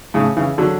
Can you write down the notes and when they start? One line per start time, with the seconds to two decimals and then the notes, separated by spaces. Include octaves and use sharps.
0.14 A2 C#3
0.36 C#3 E3
0.58 D3 F#3